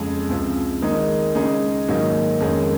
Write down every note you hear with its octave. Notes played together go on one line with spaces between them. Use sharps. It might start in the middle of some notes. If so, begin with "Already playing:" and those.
Already playing: F2 C#3 G#3
C#2 C3 F3
D#3 G#3 D#4
C#3 G#3 D#4 G#4
G#2 D#3 F#3 A#3 D#4
F2 D#3 G#3 C#4 G#4